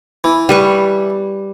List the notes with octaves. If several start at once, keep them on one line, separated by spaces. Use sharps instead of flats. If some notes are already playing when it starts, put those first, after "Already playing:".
E3
G3 B4 C#6